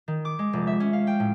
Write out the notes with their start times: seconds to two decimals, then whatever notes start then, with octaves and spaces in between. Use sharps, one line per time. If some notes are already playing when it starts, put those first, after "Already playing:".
0.08 D#3
0.25 D6
0.39 G#3
0.53 F1
0.67 E5
0.80 C#4
0.93 F5
1.07 G5
1.20 A2